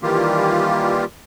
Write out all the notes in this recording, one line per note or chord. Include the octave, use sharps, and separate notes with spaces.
D#3 E3 G3 A#3 F4 G4